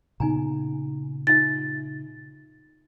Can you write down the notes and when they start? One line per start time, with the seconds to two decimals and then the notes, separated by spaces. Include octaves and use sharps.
0.20 A#2 C#3 B3 D#4 G#5 A#5
1.27 D#4 F4 E5 A6